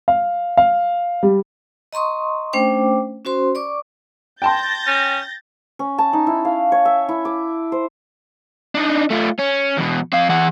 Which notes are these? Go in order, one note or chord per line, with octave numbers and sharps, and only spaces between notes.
F5
F5
G3
D#5 A#5 C6 C#6 D#6
A3 C#4 D4 C5 G5 D6
C#4 F#4 C5 C6
D5 C#6 D6
G5 A5 C6 G6 A6 A#6
C#4
C#4
A5
D#4
E4
F5
C#5
E5
E4
D6
C5
D4 D#4
A3 F4
C#4
E2 B2
C4 F5
E3 F#5